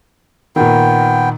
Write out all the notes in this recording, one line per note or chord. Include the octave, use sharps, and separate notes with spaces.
A#2 D#3 B3 G5